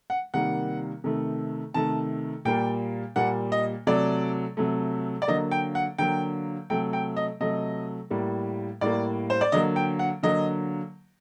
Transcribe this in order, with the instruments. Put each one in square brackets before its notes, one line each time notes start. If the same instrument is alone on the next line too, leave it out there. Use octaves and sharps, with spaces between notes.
[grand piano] F#5
C3 D#3 G3 A#3 F#5
C3 D#3 A3
C3 D#3 A3 A5
A#2 G3 A#3 G5
A#2 G3 A#3 F#5
D#5
C3 F#3 A3 D5
C3 F#3 A3
D5
D3 F#3 A#3 D#5
G5
F#5
D3 F#3 A#3 G5
C3 F#3 A3 G5
G5
D#5
C3 F#3 A3 D#5
A2 G3 A#3
A2 G3 A#3 D5
C5
D5
D3 F#3 A#3 D#5
G5
F#5
D3 F#3 A#3 D#5